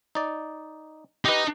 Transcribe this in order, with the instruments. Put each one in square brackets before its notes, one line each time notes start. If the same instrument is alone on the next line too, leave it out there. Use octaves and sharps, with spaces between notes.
[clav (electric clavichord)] D#4 D5
[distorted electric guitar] D#4 D#5 [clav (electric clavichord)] G4 B4